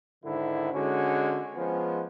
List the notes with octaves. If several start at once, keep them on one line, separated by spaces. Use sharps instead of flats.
G#2 D3 D#3 E4
D3 G#3 C#4 F#4
F3 G#3 B3 C#4